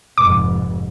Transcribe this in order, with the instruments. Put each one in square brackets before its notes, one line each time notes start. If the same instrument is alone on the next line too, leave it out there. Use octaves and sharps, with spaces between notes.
[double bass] F1 G#2 [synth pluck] D6